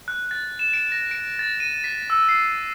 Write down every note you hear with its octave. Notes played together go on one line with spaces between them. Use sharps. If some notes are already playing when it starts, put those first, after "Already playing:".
F#6
A6
E7
D7
A#6
D7
A6
D#7
B6
E6
C7